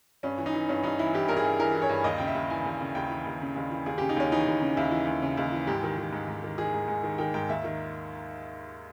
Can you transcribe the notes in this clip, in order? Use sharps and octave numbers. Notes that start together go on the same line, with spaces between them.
G2 C#4
E3
D#4
E3
G2 C#4
G2 D#4
E3 E4
E3 G4
G2 A#4
G#4
G2
E3 A#4
E3
C#5
G2
D#2 D#5
C#3 G5
E5
D#2
E3 G#5
D#2
C#3
D#2 G5
E3
D#2
C#3
D#2
E3
D#2 G#4
C#3 G4
D#4
D#2 C#4
E3 D#4
D#2
C#3
D#2 E4
E3
D#2
C#3
D#2
E3
G#2 G4
D#3
D#3
G#2
G#2
D#3
D#3 G#4
G#2
G#2
D#3
D#3 G5
G#2 G5
D#2 E5
D#3